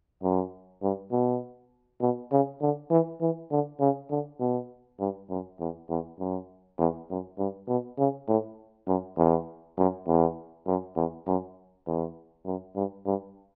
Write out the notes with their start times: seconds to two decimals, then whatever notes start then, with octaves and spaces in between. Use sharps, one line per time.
0.23 F#2
0.82 G2
1.12 B2
2.01 B2
2.32 C#3
2.61 D3
2.90 E3
3.21 E3
3.51 D3
3.80 C#3
4.10 D3
4.40 B2
5.00 G2
5.29 F#2
5.60 E2
5.90 E2
6.19 F#2
6.78 E2
7.09 F#2
7.38 G2
7.68 B2
7.98 C#3
8.28 A2
8.87 F#2
9.17 E2
9.78 F#2
10.07 E2
10.66 F#2
10.96 E2
11.27 F#2
11.86 E2
12.46 F#2
12.75 G2
13.05 G2